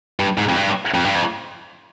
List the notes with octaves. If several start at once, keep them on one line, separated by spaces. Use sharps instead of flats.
G2
G#2
F2
G2
F2
G2
F2